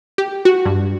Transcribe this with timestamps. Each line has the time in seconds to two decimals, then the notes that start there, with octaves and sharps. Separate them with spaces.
0.18 G4
0.45 F#4
0.65 G2